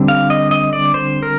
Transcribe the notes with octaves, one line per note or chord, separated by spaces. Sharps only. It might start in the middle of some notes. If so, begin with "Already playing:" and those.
Already playing: D3 G3 C4
F5
D#5
D#5
D5
C5
A#4